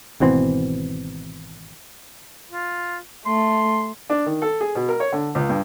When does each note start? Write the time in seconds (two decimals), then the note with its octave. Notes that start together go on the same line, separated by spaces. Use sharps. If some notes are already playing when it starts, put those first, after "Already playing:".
0.20 G#1 B2 E3 C4
2.51 F4
3.26 A3 C6
4.10 D4
4.26 D#3
4.42 A4
4.61 G#4
4.75 B2
4.89 A#4
5.00 C#5
5.12 D3
5.35 C#2
5.49 G2